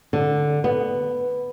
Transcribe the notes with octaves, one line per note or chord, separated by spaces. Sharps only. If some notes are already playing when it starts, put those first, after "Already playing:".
D3
B3